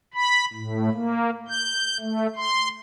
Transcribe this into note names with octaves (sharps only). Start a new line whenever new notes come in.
B5
A2
A#3
G6
A3
C6